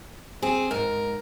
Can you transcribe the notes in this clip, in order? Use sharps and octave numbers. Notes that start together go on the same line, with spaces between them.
C4 G#4
G#2 A#4